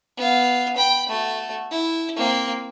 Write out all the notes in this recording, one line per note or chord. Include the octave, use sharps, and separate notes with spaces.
B3 F5
G5 B5
A3 F#4
E4
A#3 C4